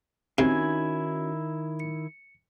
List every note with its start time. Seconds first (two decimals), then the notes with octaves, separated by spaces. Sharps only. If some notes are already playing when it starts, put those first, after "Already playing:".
0.38 C3 D#3 C#4 D#4 E4 F#4 G#5
1.80 C#7